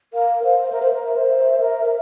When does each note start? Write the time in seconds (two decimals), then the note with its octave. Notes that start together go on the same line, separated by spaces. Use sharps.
0.14 A#4 F5
0.43 C5 F5
0.64 F5
0.72 A#4 E5
0.82 C5
0.93 A#4
1.16 C5
1.60 A#4
1.85 A#4